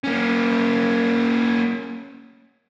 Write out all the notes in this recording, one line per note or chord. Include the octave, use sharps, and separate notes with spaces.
A#3 C#4